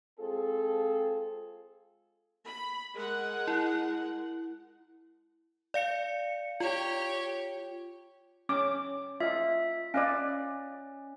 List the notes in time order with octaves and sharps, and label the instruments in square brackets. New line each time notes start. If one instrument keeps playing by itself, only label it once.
[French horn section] G#3 C4 F4 G#4 A4
[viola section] B5
G#3 A#4 F#5
[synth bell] E4
D5 F5 C#7
[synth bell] F4 [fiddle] G4 C#5
[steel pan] C#4 D6
[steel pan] F4 D#5 [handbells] E5
[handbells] C#4 [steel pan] D5 D#5 F5